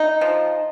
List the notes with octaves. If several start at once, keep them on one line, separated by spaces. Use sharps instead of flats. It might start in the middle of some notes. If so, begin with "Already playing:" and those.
Already playing: D#4
F3